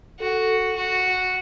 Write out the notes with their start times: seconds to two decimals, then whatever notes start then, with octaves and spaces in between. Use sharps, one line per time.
0.20 F#4 A4
0.76 F#4